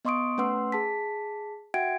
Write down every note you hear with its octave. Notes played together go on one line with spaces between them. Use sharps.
B3 D#5 C6 C#6 D#6 D7
A3 C#4 B4 F#5 C6 E6
G#4 A5 B6
F#4 E5 F#5 G5 G#6 D7